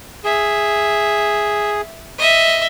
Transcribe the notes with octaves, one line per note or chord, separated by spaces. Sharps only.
G#4 E5
D#5 E5